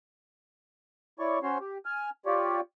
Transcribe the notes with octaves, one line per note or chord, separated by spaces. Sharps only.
E4 C#5 D5 C#6
C#4 F#4 C5 C#5 C6
G4
G#5 F6
F4 G4 C#5 D5